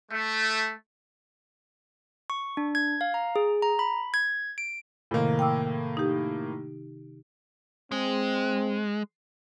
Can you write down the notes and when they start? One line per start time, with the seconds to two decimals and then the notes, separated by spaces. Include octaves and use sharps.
0.12 A3
2.30 C#6
2.57 D4
2.75 G#6
3.01 F5
3.14 A#5
3.36 G#4
3.62 A#5
3.79 B5
4.14 G#6
4.58 D7
5.11 A2 C3 D#3 A#3
5.39 G5 D6 E6
5.97 D#4 G4
7.92 G#3 C4